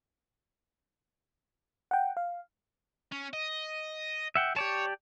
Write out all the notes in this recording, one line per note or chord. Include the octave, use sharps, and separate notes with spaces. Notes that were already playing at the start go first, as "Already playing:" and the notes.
F#5 G5
F5
C#4
D#5
E5 F#5 G5
G4 C#5 D5 A5